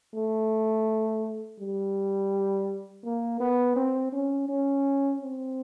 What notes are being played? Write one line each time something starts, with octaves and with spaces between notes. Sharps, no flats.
A3
G3
A#3
B3
C4
C#4
C#4
C4